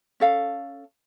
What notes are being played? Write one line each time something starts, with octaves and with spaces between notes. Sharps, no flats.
C#4 A4 F5